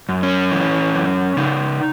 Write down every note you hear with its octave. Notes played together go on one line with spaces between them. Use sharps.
F#2
C#4
E3
F#2
C#3 D#4